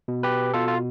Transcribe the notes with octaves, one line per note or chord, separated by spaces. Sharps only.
B2
G4 B4
B2 F4 A4
F4